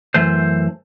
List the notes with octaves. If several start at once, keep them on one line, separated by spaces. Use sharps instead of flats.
F#2 E3 A3 C5